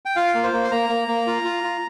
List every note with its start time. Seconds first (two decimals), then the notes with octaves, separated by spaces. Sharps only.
0.06 G5
0.16 F4 F5
0.35 A#3
0.43 C5
0.53 A#3
0.64 C6
0.71 A#3 A#5
0.90 A#3
1.08 A#3
1.27 F4
1.44 F4
1.64 F4